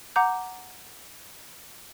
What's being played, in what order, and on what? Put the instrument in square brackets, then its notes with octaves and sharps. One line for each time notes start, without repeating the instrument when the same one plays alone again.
[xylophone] F#5 A#5 D6 G6